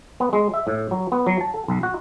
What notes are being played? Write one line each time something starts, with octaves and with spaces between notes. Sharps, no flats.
B3
G#3
E5
A2
F#3
B3
F#3
A5
A4
B1
F#4